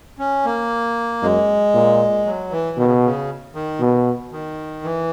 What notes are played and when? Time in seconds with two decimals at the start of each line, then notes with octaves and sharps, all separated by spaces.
0.19 C#4
0.45 A#3
1.22 F#2 G#3
1.74 A#2
2.26 F#3
2.51 E3
2.77 B2 D#3
2.85 C#3
3.03 C#3
3.55 D#3
3.80 B2
4.32 D#3
4.84 E3